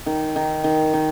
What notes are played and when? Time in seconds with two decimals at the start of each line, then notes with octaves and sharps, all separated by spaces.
0.06 D#3
0.36 D#3
0.64 D#3
0.93 D#3